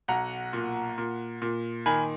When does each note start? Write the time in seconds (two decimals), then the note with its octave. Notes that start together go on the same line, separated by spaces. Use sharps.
0.08 B1 F#5 A#5
0.53 A#2
0.98 A#2
1.42 A#2
1.86 D#3 G#5 B5